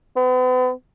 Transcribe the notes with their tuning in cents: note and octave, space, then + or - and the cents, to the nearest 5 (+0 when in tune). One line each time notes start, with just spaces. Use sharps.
B3 +40